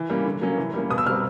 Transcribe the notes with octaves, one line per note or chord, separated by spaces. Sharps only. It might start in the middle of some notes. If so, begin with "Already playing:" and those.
Already playing: E3
G3 A#3 C#4
D3
F#3 A#3 C#4
E3
G3 A#3 C#4
B2 D#6
E6
G3 C4 F6